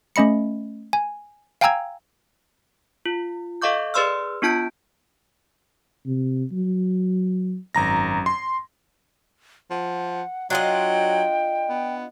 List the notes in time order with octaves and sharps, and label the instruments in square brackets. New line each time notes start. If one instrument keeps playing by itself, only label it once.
[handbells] A3 C#4 D#5 B5 C#7
G#5
F5 G5 G#5 A#5 E6 G#6
F4
A4 D#5 F5 C#6 D6 G6
G#4 B4 D5 C6 E6 F6
B3 D4 F4 A5 G6 D7
[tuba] C3
F#3
[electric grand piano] G#1 A#5 A#6 [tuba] F#2
[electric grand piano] C6
[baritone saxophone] F3 [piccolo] F#5
[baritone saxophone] F#3 [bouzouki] D4 F4 D#5 [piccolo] G5
[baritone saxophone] B3